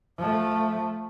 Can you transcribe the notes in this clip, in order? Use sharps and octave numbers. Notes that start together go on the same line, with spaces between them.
F3 A3